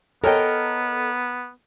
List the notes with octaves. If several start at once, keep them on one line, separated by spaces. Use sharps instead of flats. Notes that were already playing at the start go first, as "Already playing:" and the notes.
B3 A4 A#4 C#5 D#5 G5